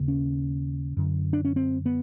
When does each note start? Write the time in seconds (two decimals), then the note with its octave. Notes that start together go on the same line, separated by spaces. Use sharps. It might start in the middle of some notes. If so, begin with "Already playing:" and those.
Already playing: D#2 C#3
0.08 C#4
0.97 F#2 D3
1.33 D4
1.45 C#4
1.56 C4
1.86 B3